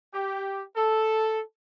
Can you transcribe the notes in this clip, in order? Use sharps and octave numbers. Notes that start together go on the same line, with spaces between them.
G4
A4